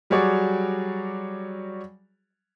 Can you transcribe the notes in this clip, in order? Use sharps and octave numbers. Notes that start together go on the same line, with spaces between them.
F#3 G3 F#4 G#4 C#5 D5